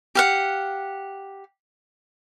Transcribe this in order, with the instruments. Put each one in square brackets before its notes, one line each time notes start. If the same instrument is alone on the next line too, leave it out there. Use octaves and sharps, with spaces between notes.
[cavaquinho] G4 F5 F#5